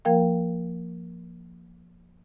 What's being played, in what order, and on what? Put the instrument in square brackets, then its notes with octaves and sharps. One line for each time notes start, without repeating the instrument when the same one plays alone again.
[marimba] F3 A#3 A#4 F5 G5